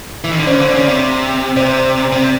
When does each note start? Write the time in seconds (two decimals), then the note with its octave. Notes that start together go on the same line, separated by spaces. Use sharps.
0.24 E3
0.31 D#3
0.39 D3
0.47 C#3 C5 D5
0.61 D3
0.74 C#3
0.88 C3
1.56 C3 C5 D5
2.12 C3